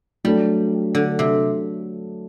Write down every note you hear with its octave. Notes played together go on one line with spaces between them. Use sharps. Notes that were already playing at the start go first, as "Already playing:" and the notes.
F#3 G3 A3 D4 A4
D3
C3